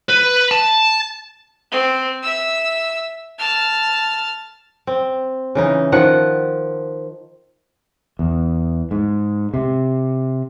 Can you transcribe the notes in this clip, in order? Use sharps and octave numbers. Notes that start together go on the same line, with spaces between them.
B4
A5
C4
E5 E6
A5 F6
C4
C#3 E3 D#4
D#3 F3 F#5
E2
G#2
C3